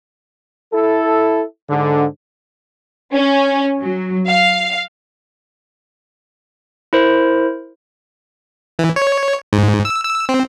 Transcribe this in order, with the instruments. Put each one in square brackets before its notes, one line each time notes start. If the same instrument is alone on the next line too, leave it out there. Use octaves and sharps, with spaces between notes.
[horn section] E4 A4
G#2 D3
[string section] C#4
F#3
F5
[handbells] E4 A#4 C5
[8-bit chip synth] E3
C#5
G#2
E6
E6
C4